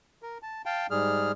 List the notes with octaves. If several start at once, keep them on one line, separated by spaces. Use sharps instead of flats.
A#4
A5
F5 G5 A5
G#2 G3 G#4 F6